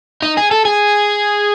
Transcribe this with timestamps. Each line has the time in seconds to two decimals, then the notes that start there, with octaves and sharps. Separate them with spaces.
0.22 D#4
0.37 G#4
0.51 A4
0.65 G#4